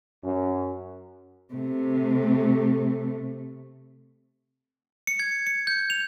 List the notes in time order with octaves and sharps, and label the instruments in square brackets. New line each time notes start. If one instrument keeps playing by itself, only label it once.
[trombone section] F#2
[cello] C3 A3
[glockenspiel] C#7
G#6
C#7
G6
F7